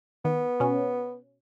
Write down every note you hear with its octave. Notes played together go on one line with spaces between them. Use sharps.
D#3 B3
B2 C#4